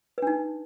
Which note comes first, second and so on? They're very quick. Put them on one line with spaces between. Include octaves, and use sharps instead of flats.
B4 D4 D#4